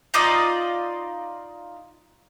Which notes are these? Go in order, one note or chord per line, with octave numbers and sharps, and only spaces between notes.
D#4 F4 D5 D#5